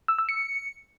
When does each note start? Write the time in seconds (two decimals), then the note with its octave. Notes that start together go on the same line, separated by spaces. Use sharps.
0.08 E6
0.19 E6
0.29 C#7